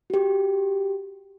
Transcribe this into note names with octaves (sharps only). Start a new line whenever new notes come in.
F#4 G4